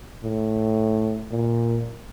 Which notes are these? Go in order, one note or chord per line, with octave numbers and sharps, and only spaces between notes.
A2
A#2